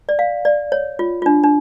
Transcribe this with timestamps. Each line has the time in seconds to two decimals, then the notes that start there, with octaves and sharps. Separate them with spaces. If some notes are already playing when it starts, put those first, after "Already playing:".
0.09 D5
0.19 F5
0.45 D5
0.72 C#5
0.99 F4
1.22 F4
1.26 D4
1.44 D4